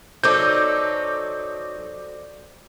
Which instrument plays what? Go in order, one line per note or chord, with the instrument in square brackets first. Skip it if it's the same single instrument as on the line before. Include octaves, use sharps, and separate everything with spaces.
[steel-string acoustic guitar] F#3 D#4 A4 [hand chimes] C5 D5 [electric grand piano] D6 G6